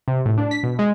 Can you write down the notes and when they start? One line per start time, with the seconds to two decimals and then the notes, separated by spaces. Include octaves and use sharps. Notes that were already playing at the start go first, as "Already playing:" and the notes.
0.08 C3
0.25 A2
0.38 D4
0.51 B6
0.63 B2
0.79 G#3